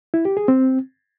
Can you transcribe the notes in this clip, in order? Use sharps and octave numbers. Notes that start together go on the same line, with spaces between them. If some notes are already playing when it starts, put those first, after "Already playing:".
E4
G4
G#4
C4